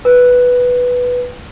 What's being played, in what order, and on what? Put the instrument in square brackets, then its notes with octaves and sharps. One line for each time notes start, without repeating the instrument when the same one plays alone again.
[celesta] B4